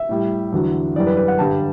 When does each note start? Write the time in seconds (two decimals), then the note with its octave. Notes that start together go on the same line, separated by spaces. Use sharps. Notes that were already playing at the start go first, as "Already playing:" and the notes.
Already playing: E5
0.09 A2 G3
0.52 E2 D3 F#3
0.96 F#2 E3 G3 D5
1.07 B4
1.17 B4
1.28 F#5
1.39 G2 D3 G3 A5